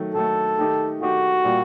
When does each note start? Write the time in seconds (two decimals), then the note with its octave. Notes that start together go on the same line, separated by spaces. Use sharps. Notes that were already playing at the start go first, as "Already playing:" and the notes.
Already playing: D#3 F#3 A3
0.14 D#3 F#3 A3 A4
0.58 D#3 A3 D#4 G4
1.01 D#3 A3 D#4 F#4 G4
1.44 A#2 G3 A#3